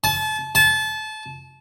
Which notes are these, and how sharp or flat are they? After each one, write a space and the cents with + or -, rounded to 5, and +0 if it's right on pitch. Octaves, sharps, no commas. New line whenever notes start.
A5 -30
A5 -25